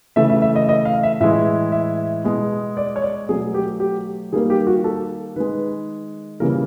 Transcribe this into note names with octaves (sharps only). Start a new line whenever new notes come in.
C#3 E3 A3 E5
E5
E5
D#5
D#5
F5
E5
A2 E3 G#3 E5
E5
B2 G#3
D5
C#5
D5
B2 F#3 A3 G#4
G4
G4
D#3 G3 A#3 G#4
G4
F#4
A4
D#3 G#3 B4
C#3 E3 G3 A#3 A#4